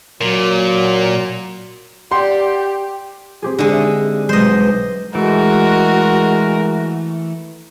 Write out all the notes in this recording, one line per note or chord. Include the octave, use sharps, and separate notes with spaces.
A#2 F#3
G4 D5 F#5 C6
C4 G4 G#4
D3 G#3 D#4
E5
B1 G#3 C5 D#5
E3 G#3 A3 F#4 A#4